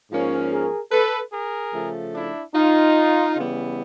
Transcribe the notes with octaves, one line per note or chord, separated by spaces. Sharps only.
G#2 F3 A#3 C#4
G#4 A#4
A4 B4
G#4 A#4
C#3 F3 A3
D4 E4
D#4 F4
C#3 E3 G3 B3